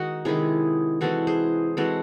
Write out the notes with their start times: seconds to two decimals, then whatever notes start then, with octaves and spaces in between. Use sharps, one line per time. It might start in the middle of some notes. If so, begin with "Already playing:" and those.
Already playing: D#3 G#3 D#4 F#4
0.25 C3 D#3 G#3 E4 G#4
1.01 E3 G#3 C4 F#4 A4
1.27 G#4 C5
1.77 E3 G#3 C4 F#4 A4